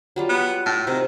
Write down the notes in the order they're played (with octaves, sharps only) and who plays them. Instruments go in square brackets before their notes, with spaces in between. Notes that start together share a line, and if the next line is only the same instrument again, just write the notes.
[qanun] F#3 G3 F4
[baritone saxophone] B3
[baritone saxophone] A2 [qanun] C6
[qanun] C3 [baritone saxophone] D#3